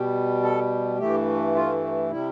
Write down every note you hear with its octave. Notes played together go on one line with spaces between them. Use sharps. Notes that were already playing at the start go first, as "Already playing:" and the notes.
Already playing: B2 G3
A4
G2 E3 A3 G4
F4
C3 G3 E4